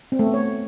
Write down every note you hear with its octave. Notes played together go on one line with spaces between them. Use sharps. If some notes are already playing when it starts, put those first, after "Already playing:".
C4
A3
B3
C#5